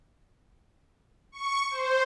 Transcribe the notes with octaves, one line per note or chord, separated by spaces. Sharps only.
C#6
C5